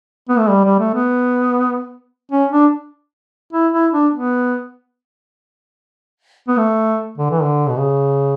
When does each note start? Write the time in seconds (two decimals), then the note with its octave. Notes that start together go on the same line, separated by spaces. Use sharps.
0.29 B3
0.39 A3
0.49 G3
0.64 G3
0.80 A3
0.95 B3
2.32 C#4
2.52 D4
3.53 E4
3.73 E4
3.93 D4
4.14 B3
6.48 B3
6.57 A3
7.18 D3
7.30 E3
7.43 D3
7.69 B2
7.78 C#3